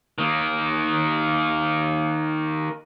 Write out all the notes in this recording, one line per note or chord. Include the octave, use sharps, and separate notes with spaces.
D#3 A#3